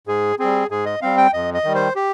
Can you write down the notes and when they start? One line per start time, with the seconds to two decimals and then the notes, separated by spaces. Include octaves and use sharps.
0.07 G#2 G#4
0.39 G3 C4 G#4
0.70 G#2 G#4
0.86 D#5
1.02 G3 C4 F5
1.17 G5
1.33 F2 D#5
1.54 D#5
1.64 D#3 G3
1.75 C5
1.96 G4